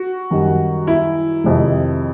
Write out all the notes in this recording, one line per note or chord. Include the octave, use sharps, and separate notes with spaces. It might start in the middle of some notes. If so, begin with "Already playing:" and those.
Already playing: F#4
F#2 D#3 G3
E4
F2 C3 D#3 G#3